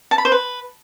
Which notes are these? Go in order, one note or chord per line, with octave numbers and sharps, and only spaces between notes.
A5
B5
C5
B4